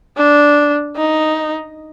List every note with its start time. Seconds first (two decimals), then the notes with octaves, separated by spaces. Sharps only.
0.17 D4
0.96 D#4